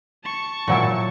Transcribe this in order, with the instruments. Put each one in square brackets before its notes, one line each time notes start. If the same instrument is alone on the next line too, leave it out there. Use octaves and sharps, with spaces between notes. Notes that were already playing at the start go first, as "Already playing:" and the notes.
[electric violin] A5 C#6
[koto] A#2 F#3 E4